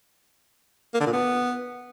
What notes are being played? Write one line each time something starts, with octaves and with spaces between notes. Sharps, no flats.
A#3
D3
A#2
B3